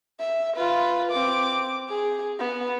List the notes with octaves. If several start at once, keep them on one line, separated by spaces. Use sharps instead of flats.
E5
F4 B4
C4 D6
G#4
B3